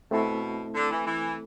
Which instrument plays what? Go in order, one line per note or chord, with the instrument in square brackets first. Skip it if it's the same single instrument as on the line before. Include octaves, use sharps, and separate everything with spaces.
[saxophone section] B2 [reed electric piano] A3 C4 E4 A4
[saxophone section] D3
E3
E3